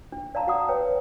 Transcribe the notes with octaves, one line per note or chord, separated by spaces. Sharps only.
D4
D4 D5 F5 A5 A#5
F#4 F#5 D#6
B4 C#5 G5